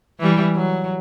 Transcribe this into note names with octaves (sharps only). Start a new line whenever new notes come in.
E3 G3
F#3